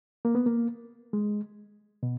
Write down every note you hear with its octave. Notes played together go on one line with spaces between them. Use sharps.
A#3
B3
A#3
G#3
B2